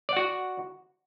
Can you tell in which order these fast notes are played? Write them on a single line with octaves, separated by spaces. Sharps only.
D5 F#5 F#4